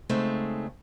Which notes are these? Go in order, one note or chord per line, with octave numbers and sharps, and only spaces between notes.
C#3 G#3 A3 C4 D#4